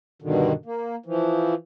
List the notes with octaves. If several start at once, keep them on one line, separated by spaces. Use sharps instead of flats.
G2 B2 D3 D#3
A#3
E3 F3